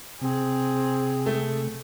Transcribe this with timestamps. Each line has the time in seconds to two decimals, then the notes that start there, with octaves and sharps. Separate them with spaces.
0.21 C3 C4 G#4
1.26 A3